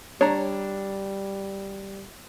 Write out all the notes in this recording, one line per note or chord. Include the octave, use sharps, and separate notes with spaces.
G3 D4 C#5 A#5